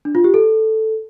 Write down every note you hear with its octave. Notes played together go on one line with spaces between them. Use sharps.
D4
F4
G4
A4